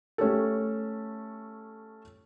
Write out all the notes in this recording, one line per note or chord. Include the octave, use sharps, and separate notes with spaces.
A3 C#4 G4 A4